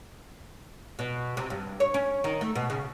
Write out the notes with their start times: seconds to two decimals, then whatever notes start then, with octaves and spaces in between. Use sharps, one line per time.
0.99 B2
1.37 C3
1.50 G2
1.80 C#5
1.94 C#4
2.24 D#3
2.41 A3
2.56 B2
2.70 C#3